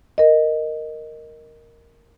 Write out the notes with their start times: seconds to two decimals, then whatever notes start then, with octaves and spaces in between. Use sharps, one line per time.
0.18 A#4 D#5